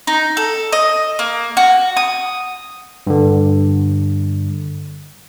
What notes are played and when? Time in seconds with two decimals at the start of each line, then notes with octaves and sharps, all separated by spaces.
0.07 D#4
0.37 A4
0.72 D#5
1.19 A#3
1.57 F#4
1.97 D#6
3.07 G2 D3